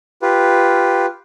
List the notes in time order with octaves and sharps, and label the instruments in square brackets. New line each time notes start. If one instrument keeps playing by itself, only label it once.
[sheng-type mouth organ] F4 G4 B4